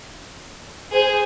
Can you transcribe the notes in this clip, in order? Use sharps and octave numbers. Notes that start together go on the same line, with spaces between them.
G#4 C5